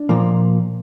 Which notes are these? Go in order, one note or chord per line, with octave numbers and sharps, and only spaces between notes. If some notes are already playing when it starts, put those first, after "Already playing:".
Already playing: D4
A#2 F3 A#3